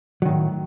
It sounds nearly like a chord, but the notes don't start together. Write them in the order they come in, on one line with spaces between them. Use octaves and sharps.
F#3 D#3 A2